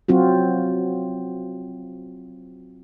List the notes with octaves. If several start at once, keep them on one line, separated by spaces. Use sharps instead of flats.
F#3 C4 F4 F#4